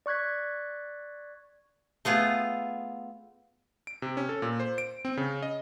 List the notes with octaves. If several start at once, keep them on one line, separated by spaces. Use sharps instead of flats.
D5 C#6 F#6 G#6 B6
A3 B3 F4 G#4
D7
C3
C#4
A4
A#2
C5
D7
C4
C#3
D#5